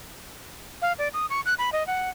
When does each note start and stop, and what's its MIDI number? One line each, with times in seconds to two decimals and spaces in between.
0.82 0.93 77
0.98 1.08 74
1.14 1.26 87
1.30 1.41 85
1.46 1.54 90
1.58 1.70 83
1.73 1.86 75
1.87 2.10 78